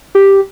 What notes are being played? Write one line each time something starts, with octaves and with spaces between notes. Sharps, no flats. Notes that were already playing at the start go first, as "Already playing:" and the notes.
G4